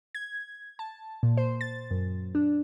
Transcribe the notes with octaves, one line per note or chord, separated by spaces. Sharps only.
G#6
A5
A#2
C5
A6
F#2
D4